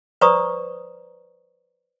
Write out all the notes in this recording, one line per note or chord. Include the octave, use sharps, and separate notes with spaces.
B4 C5 D5 A#5 C#6 D#6